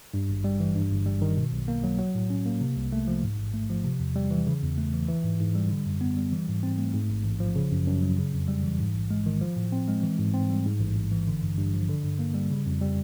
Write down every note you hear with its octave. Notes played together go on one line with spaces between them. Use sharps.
G2
G#1
G3
E3
G2
G1
G3
D#3
B2
B1
A#3
F#3
F#3
A2
C#4
A#3
C3
C2
A3
F3
G#2
A1
A3
F3
C3
E2
G3
E3
C#3
E2
A3
E3
E3
G#2
G#2
G3
D3
F#2
B3
G3
E3
G#2
C4
A3
G#2
A1
A1
F3
C#3
F#2
F#2
F#3
C#3
F2
G3
E3
G#2
A1
G#3
D#3
F3
A2
C4
G#3
E3
G#2
C4
G3
G#2
A1
A1
E3
D3
G2
G2
F3
D3
G2
A#3
G3
C#3
F2
G3